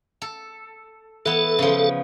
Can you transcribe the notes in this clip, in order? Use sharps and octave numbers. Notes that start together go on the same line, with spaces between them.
A4
E3 B3 A4
C#3 F3